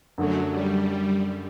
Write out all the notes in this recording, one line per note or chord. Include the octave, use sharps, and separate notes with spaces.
F#2 D3 F#3 A3
G3